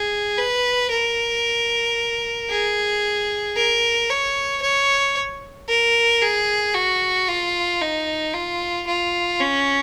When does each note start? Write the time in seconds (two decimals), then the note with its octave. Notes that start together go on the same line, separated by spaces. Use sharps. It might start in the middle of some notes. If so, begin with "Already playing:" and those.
Already playing: G#4
0.38 B4
0.91 A#4
2.50 G#4
3.56 A#4
4.10 C#5
4.62 C#5
5.68 A#4
6.21 G#4
6.74 F#4
7.28 F4
7.81 D#4
8.34 F4
8.87 F4
9.40 C#4